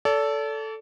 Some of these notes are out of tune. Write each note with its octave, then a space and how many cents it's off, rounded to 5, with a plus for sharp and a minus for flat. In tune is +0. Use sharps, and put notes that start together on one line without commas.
A4 +0 D5 -40